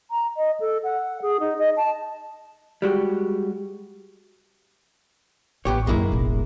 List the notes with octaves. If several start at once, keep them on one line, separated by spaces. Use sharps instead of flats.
A#5
D#5
A4
F#5
G#4
D#4
D#5
A5
G3 G#3 F#4 G4
A1 B3 G4 C#5
F#2 D#3 G#3 A#3 E4
E1 A1